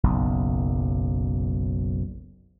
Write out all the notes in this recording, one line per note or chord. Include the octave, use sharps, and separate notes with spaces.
F#1 B1